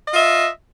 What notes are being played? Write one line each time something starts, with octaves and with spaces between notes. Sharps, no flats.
F4 D#5 E5